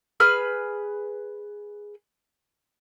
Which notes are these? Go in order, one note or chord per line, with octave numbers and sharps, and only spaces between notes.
G#4 B4 B5 F6